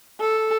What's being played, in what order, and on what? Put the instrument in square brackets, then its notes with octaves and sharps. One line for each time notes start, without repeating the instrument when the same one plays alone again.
[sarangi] A4